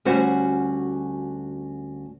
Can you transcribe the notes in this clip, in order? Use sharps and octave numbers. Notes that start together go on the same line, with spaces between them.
D2 G3 C#4 F#4 C5 F#5